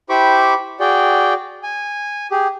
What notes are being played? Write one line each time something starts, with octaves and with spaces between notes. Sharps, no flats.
E4 G4 C5 B5 C#6 D6
F#4 G#4 D5 G5
G#5
G4 G#4